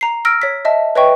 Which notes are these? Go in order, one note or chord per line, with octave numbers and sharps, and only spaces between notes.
A#5 C7
E6 F6 A#6 D7
C#5 B6
D#5 E5 A5
B4 C#5 D#5 E5 G5 C#6